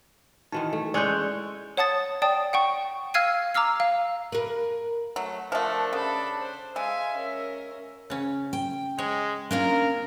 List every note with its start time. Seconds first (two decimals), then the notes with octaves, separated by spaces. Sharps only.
0.52 D#3 E3 C#4 D#4 F#4 A5
0.73 A3
0.94 G#3 C#4 C#5 D5 C6 E6 F#6 G6
1.77 C#5 F#5 A5 D#6 A6
2.22 D5 G5 A5 D#6
2.53 F#5 G5 C#6
3.14 F5 E6 F6 G#6 C7 D#7
3.54 A#5 D6 E6 F6 C7
3.80 F5
4.32 A#4 B4
5.16 F#3 A3
5.52 F3 A3 D4 A#4 F#5
5.93 C#3 A4 B5
6.41 C5
6.76 G#3 E5 F5 G#5
7.16 C#4 A#4
8.10 C#3 C#4
8.53 G5
8.99 G#3 C#5
9.51 A#3 C#4 D4 F4 A#4